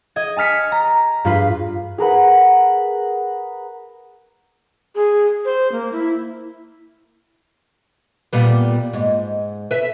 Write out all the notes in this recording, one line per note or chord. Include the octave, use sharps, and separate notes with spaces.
D#5 G#6
G#5 A5 F6 B6 C#7
A#5
G2 F4 B4
G#4 A#4 B4 F#5
G#4
C5
A#3
E4
A#2 G3 B3
G#2
B4 E5